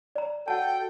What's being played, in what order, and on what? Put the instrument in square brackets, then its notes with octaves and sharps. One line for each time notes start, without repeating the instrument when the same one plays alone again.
[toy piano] D5 A#5
[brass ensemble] F#4 A4 G5 [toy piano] F#5 A5